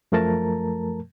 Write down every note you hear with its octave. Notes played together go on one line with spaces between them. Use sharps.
F#2 F3 A3 A#4 A5 A#5